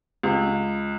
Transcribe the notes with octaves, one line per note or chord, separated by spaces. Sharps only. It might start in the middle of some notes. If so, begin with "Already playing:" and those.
C#2